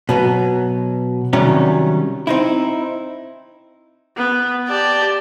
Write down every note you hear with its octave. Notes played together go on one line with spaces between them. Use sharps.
B2 F#3 B3
C3 D#3 F#3 G3 C#4
C4 D#4 E4
B3
G4 D5 A5